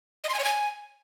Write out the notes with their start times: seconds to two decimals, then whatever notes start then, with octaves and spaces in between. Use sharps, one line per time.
0.24 D#5
0.29 C6
0.34 G#5
0.39 C#5
0.44 G#5